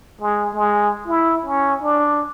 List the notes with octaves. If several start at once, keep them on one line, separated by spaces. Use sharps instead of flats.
G#3
G#3
E4
C#4
D4